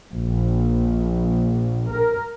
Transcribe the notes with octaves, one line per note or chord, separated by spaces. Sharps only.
A#1
A#4